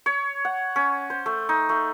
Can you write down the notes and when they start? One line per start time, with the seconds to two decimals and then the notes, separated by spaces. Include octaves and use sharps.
0.06 C#5
0.45 F#5
0.76 C#4
1.10 C5
1.26 A3
1.49 D#4
1.69 A3